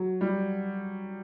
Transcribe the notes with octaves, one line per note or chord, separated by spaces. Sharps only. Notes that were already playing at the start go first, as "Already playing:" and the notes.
Already playing: F#3
G3